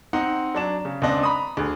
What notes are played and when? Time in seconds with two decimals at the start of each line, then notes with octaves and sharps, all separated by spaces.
0.13 C4 D#4 F#5
0.55 F#3 D4 E7
0.85 C#3
1.02 C#2 C4 D4 D#5
1.23 A#5 B5 D#6
1.57 D2 G#4